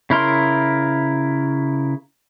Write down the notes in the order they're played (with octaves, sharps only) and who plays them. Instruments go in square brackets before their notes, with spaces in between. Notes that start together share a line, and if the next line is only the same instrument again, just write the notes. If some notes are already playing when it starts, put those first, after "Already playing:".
[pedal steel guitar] C#3 E4 A#4 C6